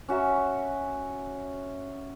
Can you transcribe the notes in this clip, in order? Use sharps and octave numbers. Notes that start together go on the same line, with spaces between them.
C#4 F#4 E5 A#5